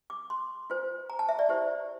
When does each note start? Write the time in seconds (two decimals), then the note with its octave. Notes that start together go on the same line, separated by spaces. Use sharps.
0.10 D6
0.30 C6
0.70 F4 C5
1.10 A#5
1.19 A5
1.29 E5
1.39 D5
1.49 E4 G4 C5